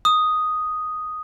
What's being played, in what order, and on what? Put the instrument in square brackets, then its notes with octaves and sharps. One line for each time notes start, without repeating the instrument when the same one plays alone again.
[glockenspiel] D#6